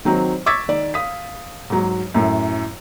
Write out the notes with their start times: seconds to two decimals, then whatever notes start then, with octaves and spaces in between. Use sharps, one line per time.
0.05 D#3 F#3 C4
0.46 C#6 D6 E6 G#6 A6 B6
0.68 D#3 D5
0.94 F5 D#6 B6
1.70 G#2 F#3
2.14 F#2 A2